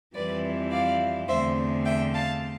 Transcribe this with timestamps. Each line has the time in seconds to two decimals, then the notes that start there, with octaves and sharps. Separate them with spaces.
0.14 F2 E3 G3 C4 E4 B4 D5
0.72 D5 F5
1.28 E2 D3 A3 C4 C5 E5
1.85 E5 G5
2.14 F5 A5